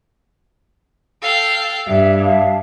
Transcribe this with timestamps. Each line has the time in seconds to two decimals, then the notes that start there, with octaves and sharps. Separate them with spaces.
1.21 A4 F5 G5
1.87 G2 E5
2.23 E5 F5 A5